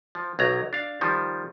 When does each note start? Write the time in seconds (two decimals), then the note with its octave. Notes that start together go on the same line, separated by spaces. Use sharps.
0.15 F3
0.39 B1 F#3 A#5
0.73 D4 F5
1.01 D#3 F3 G3